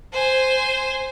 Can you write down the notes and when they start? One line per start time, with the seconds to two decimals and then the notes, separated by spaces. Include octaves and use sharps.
0.13 C5 G#5